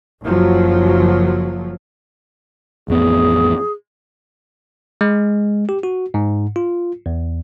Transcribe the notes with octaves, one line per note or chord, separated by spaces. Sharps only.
F#1 F3 F#3
A1 F2 B3 G#4
G#3
G4
F#4
G#2
F4
E2